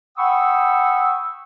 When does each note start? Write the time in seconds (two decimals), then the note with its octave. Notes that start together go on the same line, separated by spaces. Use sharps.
0.18 F#5 G5 B5 C#6 D#6 E6